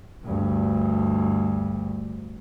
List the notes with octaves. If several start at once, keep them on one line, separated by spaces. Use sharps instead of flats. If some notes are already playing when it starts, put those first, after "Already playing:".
D2 G2